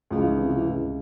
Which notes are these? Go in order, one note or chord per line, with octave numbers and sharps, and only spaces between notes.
C#2 F3
E3
D#3
C3 E3
F3
E3
C#2